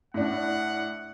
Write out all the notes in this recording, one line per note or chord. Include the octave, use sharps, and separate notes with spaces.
A2 D4 F#5